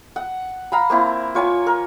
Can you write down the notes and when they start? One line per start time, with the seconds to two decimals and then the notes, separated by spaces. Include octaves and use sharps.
0.16 F#5
0.72 F5 A#5 B5
0.90 A#3 C4 E4
1.35 F4 C#5 G#5
1.66 A#4